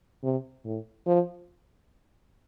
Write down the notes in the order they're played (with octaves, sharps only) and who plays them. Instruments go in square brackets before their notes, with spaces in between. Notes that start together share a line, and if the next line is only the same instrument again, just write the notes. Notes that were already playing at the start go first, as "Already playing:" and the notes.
[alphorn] C3
A2
F3